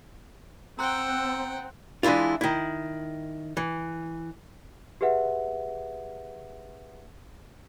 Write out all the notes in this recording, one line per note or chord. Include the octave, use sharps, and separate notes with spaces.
C4 F#5 G5 A#5 C6 E6 F#6
E3 G#3 D4 E4 F4
D#3 E4
E3
G4 G#4 B4 E5 F#5